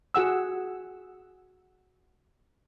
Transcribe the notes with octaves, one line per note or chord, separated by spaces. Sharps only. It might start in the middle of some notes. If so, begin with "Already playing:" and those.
F#4 G#4 F#5 E6